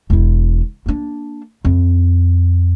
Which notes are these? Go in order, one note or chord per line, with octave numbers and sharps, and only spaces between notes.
E1 E4
A#3 D4
F2